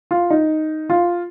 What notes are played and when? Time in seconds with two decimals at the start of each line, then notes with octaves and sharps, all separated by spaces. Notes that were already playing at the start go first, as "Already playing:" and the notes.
0.11 F4
0.30 D#4
0.90 F4